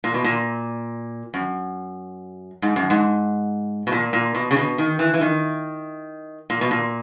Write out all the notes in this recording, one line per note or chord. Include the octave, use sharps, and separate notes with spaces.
A#2
B2
A#2
F#2
G#2
F#2
G#2
B2
A#2
A#2
B2
C#3
B2
D#3
E3
E3
D#3
A#2
B2
A#2